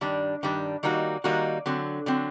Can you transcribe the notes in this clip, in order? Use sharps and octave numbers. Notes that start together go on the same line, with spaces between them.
G2 D#3 G3 D4
G2 D#3 G3 D4
D#3 G3 A#3 D#4 F#4
D#3 G3 A#3 D#4 F#4
D3 F#3 C4
D3 F#3 C4